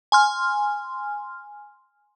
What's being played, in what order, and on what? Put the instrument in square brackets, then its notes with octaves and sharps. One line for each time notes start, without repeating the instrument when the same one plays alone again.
[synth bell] G#5 C6 F6